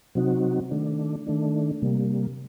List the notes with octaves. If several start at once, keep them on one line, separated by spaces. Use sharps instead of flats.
C3 F#3 C4 D#4 F#4
D#3 A3 D4
D#3 A3 D4
C3 G3 A#3